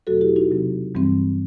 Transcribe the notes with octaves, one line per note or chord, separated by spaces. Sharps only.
E2 B2 F#3 A3 C4 F#4 A4
E4 G4
D#4 F#4
C3 F#3 C4
G2 E3 G3 C4